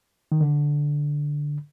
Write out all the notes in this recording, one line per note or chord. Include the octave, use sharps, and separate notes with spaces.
D#3
D3